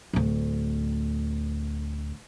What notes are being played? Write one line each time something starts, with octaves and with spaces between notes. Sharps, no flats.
D1 D2